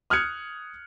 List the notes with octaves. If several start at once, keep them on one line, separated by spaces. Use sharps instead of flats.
D#6 F6 F#6 G#6 C#7